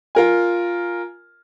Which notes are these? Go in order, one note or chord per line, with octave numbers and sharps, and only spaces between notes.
F4 A#4 G#5